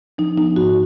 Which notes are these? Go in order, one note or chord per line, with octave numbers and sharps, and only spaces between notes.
F3 D#4
B3 D#4
G#2 F#4